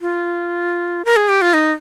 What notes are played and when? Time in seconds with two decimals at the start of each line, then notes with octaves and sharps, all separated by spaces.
0.01 F4
1.05 A#4
1.16 G#4
1.29 G4
1.42 F4
1.54 D#4